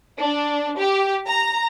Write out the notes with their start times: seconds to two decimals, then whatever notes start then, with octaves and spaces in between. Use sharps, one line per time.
0.20 D4
0.78 G4
1.27 A#5